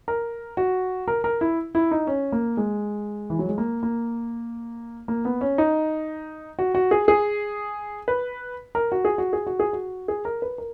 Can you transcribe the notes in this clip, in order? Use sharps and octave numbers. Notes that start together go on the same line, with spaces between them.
A#4
F#4
A#4
A#4
E4
E4
D#4
C#4
A#3
G#3
E3
F#3
G#3
A#3
A#3
A#3
B3
C#4
D#4
F#4
F#4
G#4
G#4
B4
A#4
F#4
G#4
F#4
G#4
F#4
G#4
F#4
G#4
A#4
B4
A#4